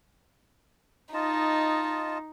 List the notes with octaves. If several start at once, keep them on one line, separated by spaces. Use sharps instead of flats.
D#4 F4 D#5 A5